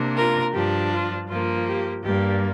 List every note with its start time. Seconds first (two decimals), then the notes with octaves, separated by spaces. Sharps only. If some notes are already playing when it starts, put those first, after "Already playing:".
Already playing: C3 A#3 D4
0.15 F4 A#4
0.52 G2 F3 D4 G4
0.90 F4
1.28 G2 F3 A#3 F4
1.66 G4
2.03 G2 G3 A#3 G4